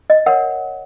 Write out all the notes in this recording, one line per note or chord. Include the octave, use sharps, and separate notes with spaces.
D#5
A#4 C#5 F#5